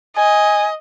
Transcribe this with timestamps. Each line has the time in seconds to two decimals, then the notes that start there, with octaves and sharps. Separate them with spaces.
0.17 D#5 G#5